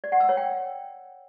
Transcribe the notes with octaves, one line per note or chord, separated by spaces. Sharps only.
D5
F#5
E6
C#5
G5